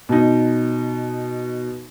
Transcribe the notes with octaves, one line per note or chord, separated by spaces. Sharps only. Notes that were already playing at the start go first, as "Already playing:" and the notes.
B2 D#4